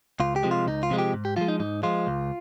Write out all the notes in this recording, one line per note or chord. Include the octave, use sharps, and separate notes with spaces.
C#2 F4
G4
C3 F3 G#3
F4
C#2 D#4
F4
C3 F3 G#3
G4
G#2
G4
F3 G#3 F4
D#4
G#2 D#4
F3 G#3 F4
C#2